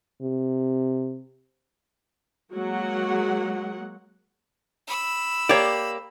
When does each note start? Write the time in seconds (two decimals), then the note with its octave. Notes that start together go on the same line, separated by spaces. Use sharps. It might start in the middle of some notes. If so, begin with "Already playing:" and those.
0.22 C3
2.54 F#3 G#3 A#3 F#5
4.87 B5 E6
5.49 A#3 G4 C#5 D5